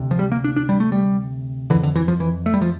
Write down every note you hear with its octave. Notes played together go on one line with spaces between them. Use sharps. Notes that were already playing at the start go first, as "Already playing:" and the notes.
Already playing: D2 C3
F3
G3
A#3
D4
D4
G3
A3
G3
F2 D3 E3
D3
E3
F3
E3
A3
G3
F3